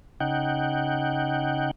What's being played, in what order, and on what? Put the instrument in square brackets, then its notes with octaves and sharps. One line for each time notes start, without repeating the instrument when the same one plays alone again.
[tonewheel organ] C#3 D#4 F#5 G5